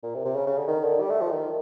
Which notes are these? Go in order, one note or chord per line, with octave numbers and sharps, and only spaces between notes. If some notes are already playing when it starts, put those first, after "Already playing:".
A#2
C3
C3
C#3
C#3
D3
D#3
D3
G3
A3
F3
D#3